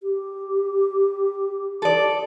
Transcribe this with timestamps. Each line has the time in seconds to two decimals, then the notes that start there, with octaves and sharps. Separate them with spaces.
0.03 G4
1.82 A4 D5